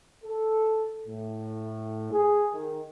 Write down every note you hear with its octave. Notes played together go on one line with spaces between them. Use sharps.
A4
A2
G#4
D#3